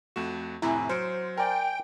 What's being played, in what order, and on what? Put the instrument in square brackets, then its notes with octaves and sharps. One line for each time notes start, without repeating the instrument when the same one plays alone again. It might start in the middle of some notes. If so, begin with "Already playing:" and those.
[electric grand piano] F2 A3 F#4 [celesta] E7
[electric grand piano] F2 A2 C3 [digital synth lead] E4 [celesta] G#5 A#5
[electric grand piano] F#3 [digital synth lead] C5 [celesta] F6 C#7 D7
[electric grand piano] A#4 D5 [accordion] G5 [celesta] G#5